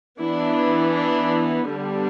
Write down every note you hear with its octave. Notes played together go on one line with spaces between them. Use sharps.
E3 B3 D4 E4
D4
D3 G3 B3 D4